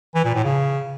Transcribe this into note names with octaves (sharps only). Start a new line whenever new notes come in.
E3
A#2
A2
C#3